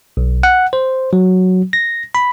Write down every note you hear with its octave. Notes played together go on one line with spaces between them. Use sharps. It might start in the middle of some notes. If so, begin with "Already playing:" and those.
B1
F#5
C5
F#3
A#6
B5